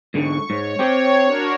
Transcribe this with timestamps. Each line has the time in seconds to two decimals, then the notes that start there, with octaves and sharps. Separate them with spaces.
0.14 G#2 D3 C#6
0.50 G#2 C#5
0.79 C4 G4
1.25 D4 F#4 A#4